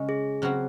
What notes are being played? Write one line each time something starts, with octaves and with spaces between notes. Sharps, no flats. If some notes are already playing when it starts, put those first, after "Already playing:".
Already playing: C#3 G#3 C#4
G#4
C#3 F#3 C4 F#4